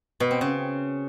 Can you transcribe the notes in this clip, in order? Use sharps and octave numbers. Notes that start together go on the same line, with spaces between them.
B2
C4
C#3